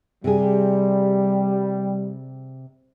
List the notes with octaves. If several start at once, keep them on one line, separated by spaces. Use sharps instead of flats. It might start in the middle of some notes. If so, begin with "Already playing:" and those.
C3 G3 G#4